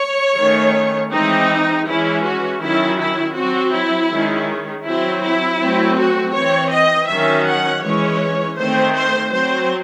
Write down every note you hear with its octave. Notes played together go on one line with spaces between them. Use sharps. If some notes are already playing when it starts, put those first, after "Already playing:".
Already playing: C#5
D#3 A3 C#4
E3 G#3 C4 D#4
E3 G#3 C#4 E4
F#4
D#3 F#3 C#4 E4
E4
F#3 C4 F#4
E4
D#3 G#3 C#4
F#3 C4 E4
E4
F#3 A3 C4
F#4
E3 C4 C#5
D#5
D#3 F#3 C#4 E5
F#5
E3 G#3 C#4 C#5
D#3 A3 C4 C5
C5
F#3 C4 C5